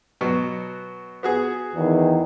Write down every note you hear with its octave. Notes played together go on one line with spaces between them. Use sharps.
B2 F#3 B3
B3 F#4 G#4
E2 D#3 E3